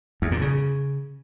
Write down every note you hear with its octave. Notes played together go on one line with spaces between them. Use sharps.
E2
A#2
C#3